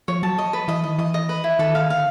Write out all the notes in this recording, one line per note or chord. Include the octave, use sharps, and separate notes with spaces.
F3 C#5
F#3 A5
D#5
B4
E3 D#5
D#3 D#5
E3 D#5
D#5
B4
E4
D#3 A4
F5
D3 F5